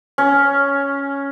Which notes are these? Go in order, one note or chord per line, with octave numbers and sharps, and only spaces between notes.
C#4